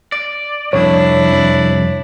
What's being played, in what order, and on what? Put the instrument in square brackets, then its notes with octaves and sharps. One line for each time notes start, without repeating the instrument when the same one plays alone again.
[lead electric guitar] D5
[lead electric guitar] C2 F2 [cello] D4 E4 [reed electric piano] C#5